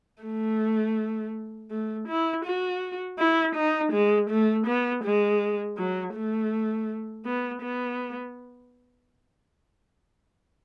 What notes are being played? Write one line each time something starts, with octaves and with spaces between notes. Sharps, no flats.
A3
A3
E4
F#4
E4
D#4
G#3
A3
B3
G#3
F#3
A3
B3
B3